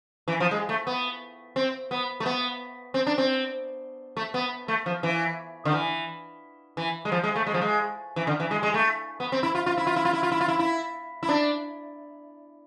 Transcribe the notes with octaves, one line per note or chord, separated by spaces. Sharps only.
E3
F3
G#3
A3
B3
C4
B3
A3
B3
C4
D4
C4
A3
B3
A3
F3
E3
D3
E3
E3
G#3
F3
G#3
A3
G#3
F3
G#3
E3
D3
E3
G#3
G#3
A3
B3
C4
E4
F4
F4
E4
F4
E4
F4
E4
F4
E4
F4
E4
E4
E4
D4